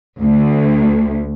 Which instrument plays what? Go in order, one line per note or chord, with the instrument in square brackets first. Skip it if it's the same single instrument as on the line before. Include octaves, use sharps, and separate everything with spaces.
[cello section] D2